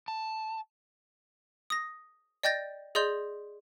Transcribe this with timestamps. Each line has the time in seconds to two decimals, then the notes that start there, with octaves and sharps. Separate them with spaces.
0.08 A5
1.70 D#6 A#6
2.43 D5 D#5 G5 G6 A6 A#6
2.95 G#4 D5 D#5 C6 G6 F7